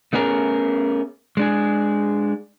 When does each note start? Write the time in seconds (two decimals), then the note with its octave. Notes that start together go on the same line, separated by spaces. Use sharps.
0.13 A3 B3 C#4 G#4 A#4
1.37 G#3 D4 G#4